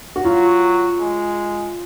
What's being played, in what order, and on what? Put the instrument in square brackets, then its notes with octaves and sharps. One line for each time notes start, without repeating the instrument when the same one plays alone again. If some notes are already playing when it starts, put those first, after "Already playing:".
[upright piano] F#4
[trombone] F#3 [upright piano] F4
[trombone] G#3